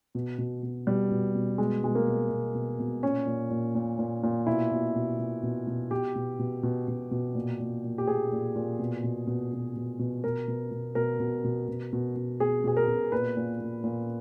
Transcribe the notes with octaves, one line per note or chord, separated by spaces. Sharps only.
B2
B2
B2
B2 G3
B2
B2
B2 G#3
B2 G#3
A#3
B2
B2
B2
B2
A#2 C#4
A#2
A#2
A#2
A#2
A#2
B2 E4
B2
B2
B2
B2
B2
B2 G4
B2
B2
B2
B2
B2
A#2
A#2
A#2
G4
A#2 G#4
A#2
A#2
B2
B2
B2
B2
B2
B2
B2 A#4
B2
B2
B2 A#4
B2
B2
B2
B2
B2
B2 G#4
B2 G#4
A#4
B2
A#2 B4
A#2
A#2
A#2